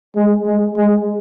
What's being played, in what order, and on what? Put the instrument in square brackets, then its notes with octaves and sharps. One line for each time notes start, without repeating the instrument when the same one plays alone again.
[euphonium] G#3
G#3
G#3